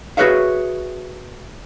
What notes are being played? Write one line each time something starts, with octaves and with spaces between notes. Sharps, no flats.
F#4 G#4 B4 C#5 E5 F5